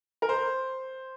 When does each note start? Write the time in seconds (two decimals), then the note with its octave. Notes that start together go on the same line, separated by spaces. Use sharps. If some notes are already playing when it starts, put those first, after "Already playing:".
0.22 A#4
0.29 C5